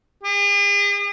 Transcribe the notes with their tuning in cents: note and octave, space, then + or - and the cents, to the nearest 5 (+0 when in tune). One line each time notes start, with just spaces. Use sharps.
G#4 -45